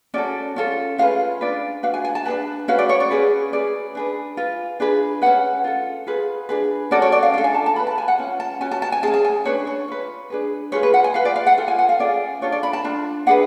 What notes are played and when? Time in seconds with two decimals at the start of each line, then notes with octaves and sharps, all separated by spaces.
0.14 C#4 F#4 A4 D5
0.56 C#4 F4 A4
0.98 C#4 F4 G#4 B4 F5
1.41 D4 F4 B4 D5
1.83 D4 F#4 B4 F5
1.94 G#5
2.05 G#5
2.15 A5
2.25 D4 G#4 B4 A5
2.68 C#4 F#4 B4 F5
2.79 D5
2.89 C#5
3.00 D5
3.11 C#4 G#4 B4
3.52 C#4 G#4 B4 D5
3.95 D4 G#4 B4
4.37 F4 B4
4.80 D4 G#4 B4
5.22 C#4 G#4 B4 F#5
5.64 F4 A4
6.07 F4 G#4 B4
6.49 D4 G#4 B4
6.91 C#4 F#4 A4 D5
7.02 C#5
7.12 D5
7.23 F5
7.34 D4 F5
7.36 F4 A4
7.44 G#5
7.54 A5
7.66 A5
7.76 F4 B5
7.79 B4
7.87 A5
7.98 G#5
8.08 F#5
8.19 C#4 F4
8.40 A5
8.61 C#4 F#4 G#5
8.71 A5
8.82 A5
8.92 G#5
9.03 C#4 F4 G#4 A5
9.14 A5
9.25 G#5
9.45 D4 G#4 B4 C#5
9.67 C#5
9.88 F4 B4
10.30 D4 G#4 B4
10.72 F4 G#4 B4 C#5
10.83 B4
10.94 F#5
11.04 G#5
11.14 F4 B4 F5
11.25 D5
11.36 F5
11.47 F#5
11.58 F4 A4 G#5
11.68 G#5
11.79 F#5
11.89 F5
11.99 C#4 F4 G#4 D5
12.41 D4 F4 A4 C#5
12.52 D5
12.63 B5
12.73 A5
12.84 D4 F4
13.27 D4 G#4 B4 F#5